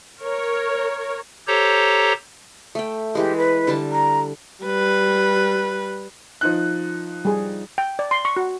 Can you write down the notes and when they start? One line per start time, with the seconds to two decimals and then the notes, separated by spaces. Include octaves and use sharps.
0.23 A#4 C#5
1.47 G4 A4 C5 C#5 A#5
2.75 A3 G5
3.15 E3 G#3 G4
3.37 B4
3.67 D3 G3 A5
3.92 A#5
4.64 G3 B4
6.41 F3 D#4 F#6
7.25 G3 G#4
7.78 G5
7.99 D5
8.11 C6
8.25 C#6
8.36 F#4